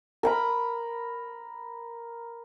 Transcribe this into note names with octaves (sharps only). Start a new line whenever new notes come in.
A#4 A#5 B5